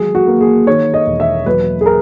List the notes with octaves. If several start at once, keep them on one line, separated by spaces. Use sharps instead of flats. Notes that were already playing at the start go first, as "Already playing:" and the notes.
Already playing: D#3 F#3 G#3 G#4
F#4
A#3
G#4
D#3 C#5
D#5
E1
E5
F#3 B4
G#4
A#4